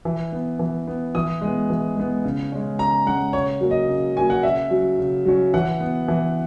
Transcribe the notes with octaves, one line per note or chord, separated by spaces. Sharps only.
E3
B3
E3
B3
E3 D#6
G#3 B3
E3
G#3 B3
C#3
G#3 C#4
C#3 A#5
G#3 C#4 F#5
C#3 C#5
F#3 A#3 C#4
D#5
C#3
F#3 A#3 C#4 G#5
F#5
C#3 E5
F#3 C#4
C#3
F#3 C#4
E3 F#5
B3
E3